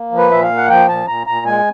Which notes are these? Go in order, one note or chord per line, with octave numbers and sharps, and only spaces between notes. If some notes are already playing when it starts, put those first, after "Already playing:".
Already playing: A#3
F3
B4
A#2 E5
F5
A#3
F#5
F3 G5
A#2 A5
A#2 A#5
A#2 A#5
G#3 G#5